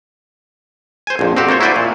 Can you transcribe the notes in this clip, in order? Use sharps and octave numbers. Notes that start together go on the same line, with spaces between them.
C5 G#5
A#1 F2
C4 F#4 G4 C5
A#3 A4 C5 C#5
E4 F#4 C5 D5 G#5
A#2